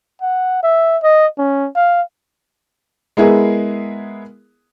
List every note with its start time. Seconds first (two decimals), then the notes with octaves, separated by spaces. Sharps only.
0.22 F#5
0.63 E5
1.03 D#5
1.38 C#4
1.75 F5
3.17 G#3 B3 E4 G#4 A#4